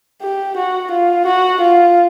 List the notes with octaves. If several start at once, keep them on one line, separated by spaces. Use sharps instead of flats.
G4
F#4
F4
F#4
F4